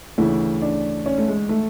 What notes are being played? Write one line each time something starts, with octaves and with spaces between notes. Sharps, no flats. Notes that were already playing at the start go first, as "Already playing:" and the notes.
D2 C#3 E3 E4
D4
C#4
A3
G#3
A3